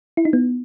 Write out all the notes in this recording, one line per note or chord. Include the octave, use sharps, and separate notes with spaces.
E4
D#4
B3